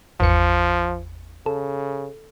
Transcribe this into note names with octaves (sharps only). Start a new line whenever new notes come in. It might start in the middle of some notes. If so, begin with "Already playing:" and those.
G#1 E2 F3 C#7
C#3 A4